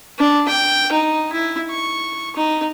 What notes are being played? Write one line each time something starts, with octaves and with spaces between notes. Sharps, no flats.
D4
G5
D#4
E4
C#6
D#4